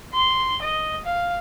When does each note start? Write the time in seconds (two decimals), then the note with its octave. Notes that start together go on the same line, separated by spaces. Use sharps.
0.14 C6
0.62 D#5
1.05 F5